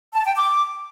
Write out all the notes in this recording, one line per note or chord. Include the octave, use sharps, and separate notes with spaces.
A5
G5
D6